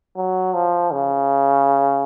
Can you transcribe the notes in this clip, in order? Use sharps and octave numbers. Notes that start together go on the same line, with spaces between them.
F#3
F3
C#3